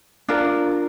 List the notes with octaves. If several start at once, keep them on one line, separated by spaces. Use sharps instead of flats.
D4 F4 A#4